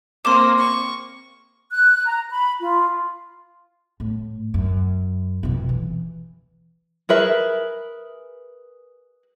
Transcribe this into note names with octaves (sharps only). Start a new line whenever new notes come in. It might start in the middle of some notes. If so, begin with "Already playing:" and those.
A#3 C4 C6 D6 E7
C#6
F#6
A#5
B5
F4
A2
F#2
F2 B2
E3
G#4 A#4 B4 E5